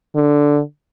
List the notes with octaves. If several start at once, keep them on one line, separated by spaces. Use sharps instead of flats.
D3